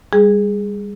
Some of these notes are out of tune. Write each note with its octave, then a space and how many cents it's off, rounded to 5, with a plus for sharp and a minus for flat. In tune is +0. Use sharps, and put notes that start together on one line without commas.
G3 +35 G#4 +0